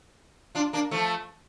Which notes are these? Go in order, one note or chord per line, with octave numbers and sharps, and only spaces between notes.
D4 F4
A#3 D4
F3 A3